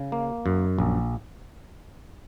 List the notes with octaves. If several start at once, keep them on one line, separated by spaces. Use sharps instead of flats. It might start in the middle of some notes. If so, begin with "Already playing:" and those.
Already playing: C#3
A#3
F#2
A#1